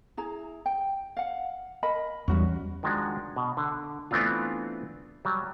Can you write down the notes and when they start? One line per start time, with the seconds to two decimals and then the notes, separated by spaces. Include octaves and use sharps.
0.17 E4 G#4 A#5
0.66 G5
1.17 F5 F#5
1.83 A#4 D#5 B5
2.28 E2 G3 C#4 F#4
2.83 D#3 F3 G#3 D4 F#4
3.36 B2
3.57 D3
4.11 E3 A3 B3 C4 D4 F4
5.25 F#3 G3